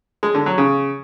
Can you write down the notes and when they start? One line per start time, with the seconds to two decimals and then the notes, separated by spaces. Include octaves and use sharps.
0.23 G#3
0.34 D3
0.46 F#3
0.58 C#3